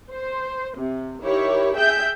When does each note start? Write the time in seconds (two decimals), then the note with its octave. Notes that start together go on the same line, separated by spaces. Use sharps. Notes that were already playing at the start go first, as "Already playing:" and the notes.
0.11 C5
0.78 C3
1.23 D#3 E4 G4 C#5
1.76 G#4 E5 G5 G6